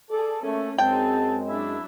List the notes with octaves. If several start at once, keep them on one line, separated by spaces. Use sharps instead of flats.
G#4 A4 D5
A3 A#3 C#4
F#2 G#3 C4 D#4 G5 A5
F#3 D4 E4 E5